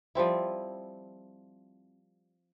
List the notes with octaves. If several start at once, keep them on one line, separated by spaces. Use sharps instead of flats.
F3 G3 C4 E4